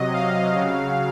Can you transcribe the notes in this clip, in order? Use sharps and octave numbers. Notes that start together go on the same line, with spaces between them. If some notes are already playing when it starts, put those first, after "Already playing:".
Already playing: C3 F#3 D#5
F5
C#3 F#3